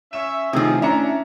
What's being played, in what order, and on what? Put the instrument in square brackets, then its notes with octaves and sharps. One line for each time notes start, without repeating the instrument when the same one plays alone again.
[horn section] C#4 C#5 E5 [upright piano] E7
[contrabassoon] A2 [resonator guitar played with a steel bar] C3 F3 [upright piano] D#3 D#4 [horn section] G#4
[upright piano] C#4 A#5 C#7 [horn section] D4 [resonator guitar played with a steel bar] E5